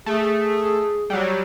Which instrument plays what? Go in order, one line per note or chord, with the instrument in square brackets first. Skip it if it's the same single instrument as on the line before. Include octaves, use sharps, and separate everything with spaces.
[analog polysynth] A3 [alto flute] G#4
[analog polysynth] F#3 G3